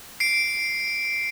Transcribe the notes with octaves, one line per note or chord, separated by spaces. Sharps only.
C7 D7